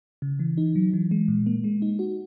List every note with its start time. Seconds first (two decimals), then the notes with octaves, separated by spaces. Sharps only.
0.22 C#3
0.39 E3
0.58 D#4
0.76 F#3
0.93 E3
1.11 G#3
1.28 A#2
1.46 A#3
1.64 G#3
1.82 D#4
1.99 F#4